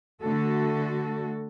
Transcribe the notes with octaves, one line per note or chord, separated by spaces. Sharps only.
D3 A3 F#4 A4